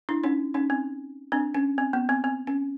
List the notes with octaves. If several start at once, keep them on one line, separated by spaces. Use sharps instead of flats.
D4 E4
C#4 D#4
C#4 D#4
C4
C4 D4
C#4
C4
B3
C4
C4
C#4